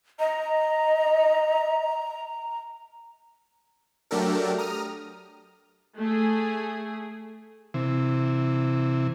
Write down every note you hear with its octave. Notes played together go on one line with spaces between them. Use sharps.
D#5 A#5
F#3 A3 D4 G4 A4 A#4
A#5 D#6 F6
A3 G#4
C3 E3